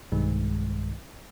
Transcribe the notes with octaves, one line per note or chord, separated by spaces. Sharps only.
B1 G2 D#3 G#3